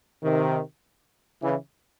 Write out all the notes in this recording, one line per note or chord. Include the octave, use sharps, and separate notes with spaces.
C3 D#3
C#3 E3